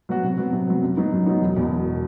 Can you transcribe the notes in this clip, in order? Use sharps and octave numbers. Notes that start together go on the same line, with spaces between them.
F#3 B3 F#4
C3
F#3 B3
C3
F#3 B3
F#2
F#3 B3 D#4
F#2
F#3 B3 D#4
E1
E2 B2
E1
B2